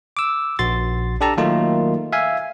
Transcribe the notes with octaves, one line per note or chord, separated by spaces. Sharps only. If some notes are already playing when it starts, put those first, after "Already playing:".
D6 E6
A#1 F#4 C6 A6
D4 G4 A4 A5 A#5
D#3 F#3 A3 A#3 D#4 F4
E5 F5 G#5